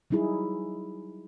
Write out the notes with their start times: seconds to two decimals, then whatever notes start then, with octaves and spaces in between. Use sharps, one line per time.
0.11 F#3 G3 D#4 E4 G#4